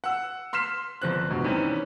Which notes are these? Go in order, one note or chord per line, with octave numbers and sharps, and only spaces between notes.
F#5 E6
C6 F6 B6 C7 E7
G1 F3 C4 F#6
E1 G2 B2
C3 D#3 E3 G3 C4 C#4